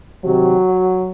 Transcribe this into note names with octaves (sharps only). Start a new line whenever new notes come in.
C3 D#3 F#3